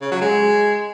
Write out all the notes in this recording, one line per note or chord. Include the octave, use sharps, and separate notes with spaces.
C#3
F#3
G#3